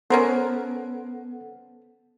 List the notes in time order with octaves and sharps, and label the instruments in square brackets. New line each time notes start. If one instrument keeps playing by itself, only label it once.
[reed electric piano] B3 A4 F#5 [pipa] C#4 A#4 C5